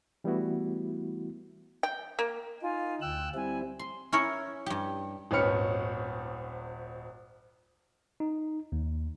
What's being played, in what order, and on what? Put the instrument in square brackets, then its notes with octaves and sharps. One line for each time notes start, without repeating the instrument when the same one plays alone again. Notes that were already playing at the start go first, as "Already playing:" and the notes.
[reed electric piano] E3 G3 A3 B3 E4 F#4
[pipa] G5
A#3
[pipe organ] D#4 [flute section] F4 G#5
[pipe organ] D2 E6 F#6 [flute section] G5
[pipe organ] G3 C4 E4 [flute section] G#5
[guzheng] C6
C#4 E4 A#4 C#5
G2 G4
[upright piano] D#1 G#1 C#4 B4 F6 C#7
[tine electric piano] D#4
D#2